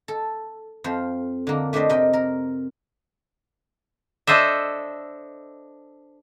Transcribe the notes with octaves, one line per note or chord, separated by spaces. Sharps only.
A4
F2 F4 C5
D3 A#3
A3 D4 G4 C5 D5 D#5
C3 A#4 D#5 G5
A#4
D4 A4 C5 D#5 E5